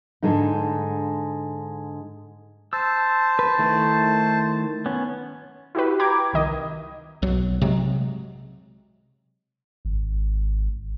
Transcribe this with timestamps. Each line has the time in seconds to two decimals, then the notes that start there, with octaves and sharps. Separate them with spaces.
0.23 G#2 D3 G#3 D4 D#4
2.73 C5 A5 E6
3.39 B4
3.59 D#3 A3 E4
4.86 B3 C#4
5.75 E4 F#4 G4 B4
5.99 G5 A#5 B5 D6 G#6
6.33 C2 D#3 D#5
7.22 B1 F#3
7.61 C3 F#3 G#3
9.85 G#1